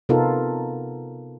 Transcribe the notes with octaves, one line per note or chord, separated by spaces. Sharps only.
C3 B3 D#4 F4 A4 A#4